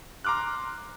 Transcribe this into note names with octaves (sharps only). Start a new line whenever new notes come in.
A#5 C6 D6 F6 F#6